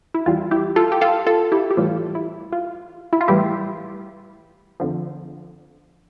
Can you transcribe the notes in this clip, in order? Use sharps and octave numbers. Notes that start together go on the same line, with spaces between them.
E4
E2 E3 G3 F4
E4 G4
F4 A4
G4
F4 A4
F4 A4
E4 G4
G4
A2 E3 G3 F4
E4
F4
E4
F4
A2 E3 G3 E4 G4
F2 D3 F3